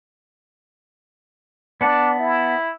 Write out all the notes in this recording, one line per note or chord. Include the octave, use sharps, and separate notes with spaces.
B3 D4 F#5 A5
E4